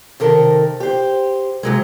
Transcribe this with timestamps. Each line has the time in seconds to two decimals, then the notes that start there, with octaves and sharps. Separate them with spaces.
0.20 C3 D#3 A4 A#4
0.80 G4 C5
1.63 C3 F#3 G#3